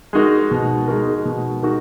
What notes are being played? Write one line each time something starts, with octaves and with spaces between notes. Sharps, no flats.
G#3 D#4 F#4 A#4
B2
G#3 D#4 F#4 A#4
B2
G#3 D#4 F#4 A#4